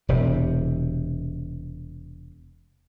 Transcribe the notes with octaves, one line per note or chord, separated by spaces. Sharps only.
E1 C3